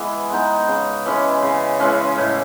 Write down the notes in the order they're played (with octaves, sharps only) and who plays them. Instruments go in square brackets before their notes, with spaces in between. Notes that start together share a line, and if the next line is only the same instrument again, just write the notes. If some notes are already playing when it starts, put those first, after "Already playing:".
Already playing: [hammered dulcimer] E3 G#3 B3
G#3 B3 D#4
C#3
E3 G#3 C#4
C#3
E3 G#3 C#4
A2